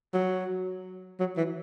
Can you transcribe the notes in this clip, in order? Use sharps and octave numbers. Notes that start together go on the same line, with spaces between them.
F#3
F#3
E3